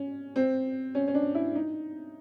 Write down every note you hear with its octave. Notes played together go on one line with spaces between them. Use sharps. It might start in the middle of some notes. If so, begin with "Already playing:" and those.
Already playing: C#4
C4
C#4
C#4
D4
E4
D#4